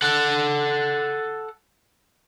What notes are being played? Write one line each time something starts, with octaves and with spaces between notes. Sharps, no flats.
A4 F#5